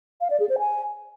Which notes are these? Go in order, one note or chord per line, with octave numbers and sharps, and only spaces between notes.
F5
D5
G#4
C5
G#5